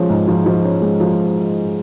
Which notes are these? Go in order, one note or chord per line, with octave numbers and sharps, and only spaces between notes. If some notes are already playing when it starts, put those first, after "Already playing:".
Already playing: F3 G#3 C#4
G#2
F3
F3
C#4
G#3
F3